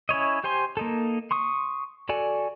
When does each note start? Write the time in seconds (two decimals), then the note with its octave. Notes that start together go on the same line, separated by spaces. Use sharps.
0.09 C#4 E4 C#5 D#5
0.44 G4 C5 G#5 C6
0.77 A#3 D#4 A4
1.31 C6 C#6 D#6
2.09 F#4 A4 D5 G#5